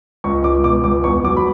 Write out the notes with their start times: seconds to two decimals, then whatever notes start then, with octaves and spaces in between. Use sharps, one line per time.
0.24 C#2 C#6
0.44 C#2 D6
0.64 B2 D6
0.84 C#2 D6
1.04 E2 C#6
1.24 F#3 D6
1.37 B5